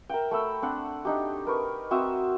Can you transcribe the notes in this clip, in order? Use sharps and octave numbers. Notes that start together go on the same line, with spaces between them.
A#4 E5 F#5 G5
A3 B5 E6
C4 D4 F#5
D4 D#4 G4
A#4 B4 C#6
C4 F#4 E5 D#6